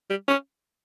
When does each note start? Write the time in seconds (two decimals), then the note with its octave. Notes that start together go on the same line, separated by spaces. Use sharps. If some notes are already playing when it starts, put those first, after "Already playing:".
0.10 G3
0.28 C#4